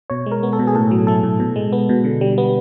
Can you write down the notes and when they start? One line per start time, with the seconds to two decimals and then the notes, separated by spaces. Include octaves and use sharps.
0.10 B2 C#5
0.26 G#3
0.31 A#4
0.43 B3
0.53 A4
0.59 B2
0.67 G#4
0.75 A2 A4
0.91 F#3
1.07 A3 A4
1.24 A2
1.40 B2
1.56 G#3
1.73 B3
1.89 B2
2.04 D3
2.21 G3
2.38 B3